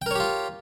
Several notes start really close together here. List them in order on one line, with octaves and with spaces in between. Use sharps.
G5 A#4 C#5 G4 F4